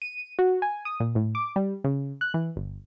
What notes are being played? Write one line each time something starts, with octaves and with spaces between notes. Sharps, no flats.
D#7
F#4
G#5
D#6
A#2
A2
D6
G3
C#3
F#6
E3
G1